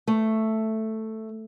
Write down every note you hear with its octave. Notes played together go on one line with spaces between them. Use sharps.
A3